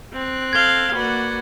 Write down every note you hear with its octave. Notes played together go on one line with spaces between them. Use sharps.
C4 F#6
A4 F5 G#6 G7
A#3 F#4 B4 D5 F#5